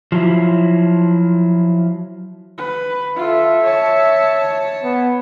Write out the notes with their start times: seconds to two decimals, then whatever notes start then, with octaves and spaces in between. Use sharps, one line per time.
0.12 F3 F#3 E4
2.58 B4
3.16 F4 A4 E5
3.62 C#5 A5
4.84 B3